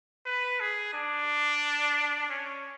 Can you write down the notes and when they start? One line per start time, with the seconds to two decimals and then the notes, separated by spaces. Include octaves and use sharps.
0.26 B4
0.60 G#4
0.93 D4
2.29 C#4